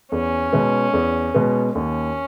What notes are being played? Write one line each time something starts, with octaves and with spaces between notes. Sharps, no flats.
E2 C#4
B2 G#3 B3
E2
B2 G#3 B3
D#2 C#4